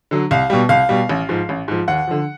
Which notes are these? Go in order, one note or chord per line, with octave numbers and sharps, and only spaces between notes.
D3 F#3
C2 F5
B2 G3
C2 F5
B2 G3
A1
G#2 F3
A1
G#2 F3
D#2 F#5
D3 F3